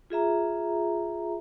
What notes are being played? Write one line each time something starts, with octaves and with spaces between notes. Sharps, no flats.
F4 G#4 E5 A#5